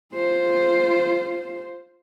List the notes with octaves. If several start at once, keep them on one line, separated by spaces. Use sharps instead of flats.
F4 C5